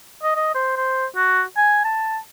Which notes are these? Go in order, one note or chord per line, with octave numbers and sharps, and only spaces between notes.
D#5
D#5
C5
C5
F#4
G#5
A5